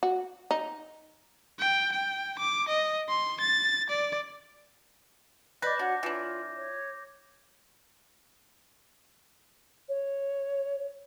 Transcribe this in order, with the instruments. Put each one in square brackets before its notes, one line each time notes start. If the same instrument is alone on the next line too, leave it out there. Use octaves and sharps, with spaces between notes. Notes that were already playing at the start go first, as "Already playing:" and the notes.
[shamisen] F#4
D#4
[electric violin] G5
G5
D6
D#5
C6
A6
D5
[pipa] B4 [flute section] D5 D#5 [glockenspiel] D6 G6 A#6
[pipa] D4 [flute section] F#4 C#5 F#5
[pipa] E3 D4 [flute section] F4 C#5
[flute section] C#5
[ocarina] C#5